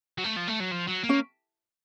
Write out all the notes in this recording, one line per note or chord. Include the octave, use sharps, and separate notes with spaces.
F#3
A3
F3
A3
F#3
F3
F#3
A#3
C#4